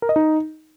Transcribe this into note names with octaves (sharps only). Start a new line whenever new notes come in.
A#4
D#5
D#4